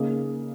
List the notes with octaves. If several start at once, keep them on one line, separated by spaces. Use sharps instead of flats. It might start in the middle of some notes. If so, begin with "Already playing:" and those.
Already playing: C#3 A#3 D#4 G#4